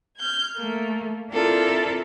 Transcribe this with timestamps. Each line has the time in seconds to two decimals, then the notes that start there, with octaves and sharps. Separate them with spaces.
0.17 F6 G6 G#6
0.56 A3 A#3
1.31 C4 D4 E4 F4 A4 A#4